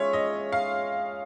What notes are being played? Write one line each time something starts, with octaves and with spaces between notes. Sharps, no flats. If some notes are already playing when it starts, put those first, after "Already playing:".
Already playing: G#3 C#4 F4 C#5 E5
D#5
F5